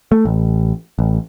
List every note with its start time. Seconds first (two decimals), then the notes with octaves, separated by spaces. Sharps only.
0.12 A3
0.25 A1
0.99 A1